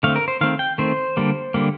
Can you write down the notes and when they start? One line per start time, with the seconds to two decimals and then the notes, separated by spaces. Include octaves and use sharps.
0.03 D3 A3 C4 F5
0.16 A#4
0.28 C5
0.41 D#3 A3 C4 F5
0.59 G5
0.78 D#3 A3 C4 C5
1.17 D3 G3 A#3
1.54 D3 G3 A#3